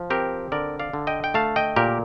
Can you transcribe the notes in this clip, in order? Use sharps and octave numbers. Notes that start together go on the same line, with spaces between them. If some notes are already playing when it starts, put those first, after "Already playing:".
Already playing: F3
C4 G4 A#4
D3 A#4 D5
D5 F5
D3
D#5 G5
G5
A3 F5 A5
D#5 G5
A#2 G4 A#4